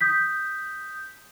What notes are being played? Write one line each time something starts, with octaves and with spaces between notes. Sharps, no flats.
D#6 G6 B6